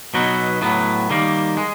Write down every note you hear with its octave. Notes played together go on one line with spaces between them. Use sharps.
B2 F#3 B3 D#4 F#4
A2 F#3 B3
D#3 G3 A#3
G#3